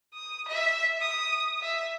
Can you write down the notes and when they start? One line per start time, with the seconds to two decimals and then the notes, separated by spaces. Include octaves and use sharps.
0.14 D#6
0.48 E5
1.01 D#6
1.62 E5